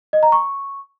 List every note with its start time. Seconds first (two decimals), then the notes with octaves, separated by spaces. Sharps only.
0.13 D#5
0.23 A#5
0.32 C#6